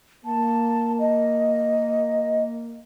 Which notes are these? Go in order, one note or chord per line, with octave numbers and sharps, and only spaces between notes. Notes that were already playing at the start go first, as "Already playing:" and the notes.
A#3 A5
D#5